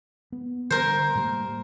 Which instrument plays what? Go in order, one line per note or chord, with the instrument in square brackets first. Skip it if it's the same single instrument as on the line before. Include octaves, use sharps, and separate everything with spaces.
[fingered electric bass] B3
[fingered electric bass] D3 G3 [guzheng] A#4 C5
[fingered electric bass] A2 G3 A#3